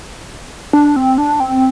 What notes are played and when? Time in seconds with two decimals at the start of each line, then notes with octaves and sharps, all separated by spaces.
0.73 D4
0.96 C4
1.18 D4
1.40 C4